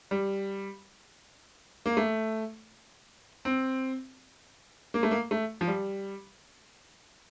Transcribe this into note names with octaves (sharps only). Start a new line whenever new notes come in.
G3
A#3
A3
C4
A#3
A3
A#3
A3
F3
G3